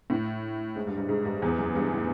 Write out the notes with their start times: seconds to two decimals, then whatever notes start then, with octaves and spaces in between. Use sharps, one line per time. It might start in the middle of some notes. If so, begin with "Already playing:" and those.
0.10 A2
0.75 G#2
0.87 G2
0.98 G2
1.09 G#2
1.25 G2
1.42 E2
1.59 F#2
1.75 G2
1.92 A2